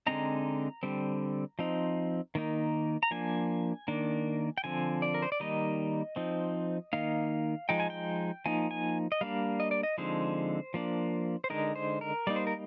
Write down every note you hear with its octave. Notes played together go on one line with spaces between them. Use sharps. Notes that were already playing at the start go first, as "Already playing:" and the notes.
D3 G#3 C4 D#4 A#5
D3 G3 C4
F3 C4 D#4
D#3 A#3 D#4
A#5
F3 A#3 D4 G#5
D#3 A#3 D4
G5
D3 F3 C4 G#5
D5
A#4
C5
D5
D#3 G3 A#3 D#4 D#5
F3 C4 D#4
D#3 A#3 D#4 F5
F3 G#3 D#4 G5
G#5
G5
F3 A#3 D#4 G#5
G#5
D#5
G3 A#3 D4 F5
D#5
D5
D#5
D3 F3 G#3 C4 D#4 C5
F3 A#3 D4
C5
D3 G#3 D#4 A#4
C5
A#4
G3 A#3 D#4 D5
C5
A#4